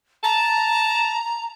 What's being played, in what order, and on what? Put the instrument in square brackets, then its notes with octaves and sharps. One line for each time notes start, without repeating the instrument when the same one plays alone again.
[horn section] A5 [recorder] A#5